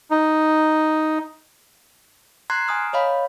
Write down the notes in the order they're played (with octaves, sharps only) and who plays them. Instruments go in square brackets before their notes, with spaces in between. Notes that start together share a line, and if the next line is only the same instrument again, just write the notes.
[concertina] D#4
[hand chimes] A#5 C6 F#6 G#6 C7
G#5 A#5 D#6 F6
C#5 D#5 F5 B5